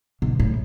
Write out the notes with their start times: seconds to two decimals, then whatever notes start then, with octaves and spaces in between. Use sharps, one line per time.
0.22 B2
0.40 A2